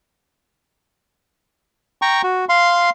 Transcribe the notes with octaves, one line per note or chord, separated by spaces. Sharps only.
G5 A#5 C#6
F#4
F5 C6